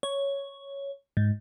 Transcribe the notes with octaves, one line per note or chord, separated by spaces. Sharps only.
C#5
G#2